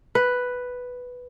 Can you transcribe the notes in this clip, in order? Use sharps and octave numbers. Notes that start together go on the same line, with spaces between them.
B4